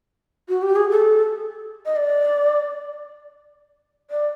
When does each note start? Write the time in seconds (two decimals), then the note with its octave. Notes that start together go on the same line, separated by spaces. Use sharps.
0.49 F#4
0.62 G4
0.76 G#4
0.90 A4
1.85 D#5
1.96 D5
4.10 D5